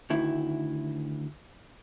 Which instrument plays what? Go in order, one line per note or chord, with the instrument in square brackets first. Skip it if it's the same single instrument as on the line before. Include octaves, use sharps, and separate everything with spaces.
[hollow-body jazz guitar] D2 D#3 E4